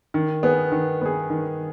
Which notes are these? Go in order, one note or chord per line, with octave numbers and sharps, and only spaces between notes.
D#3
B3 G#4
D#3
B3 G#4
D#3